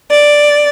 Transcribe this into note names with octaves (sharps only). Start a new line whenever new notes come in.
D5